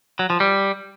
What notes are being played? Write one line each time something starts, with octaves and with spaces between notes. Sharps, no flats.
F#3
F3
G3